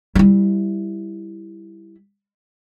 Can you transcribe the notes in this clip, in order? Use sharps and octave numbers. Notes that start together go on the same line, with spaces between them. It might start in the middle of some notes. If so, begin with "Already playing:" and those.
G3 E4